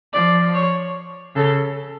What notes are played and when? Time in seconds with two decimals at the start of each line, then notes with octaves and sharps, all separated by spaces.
0.13 F3 D5
0.54 C#5
1.35 C#3 A4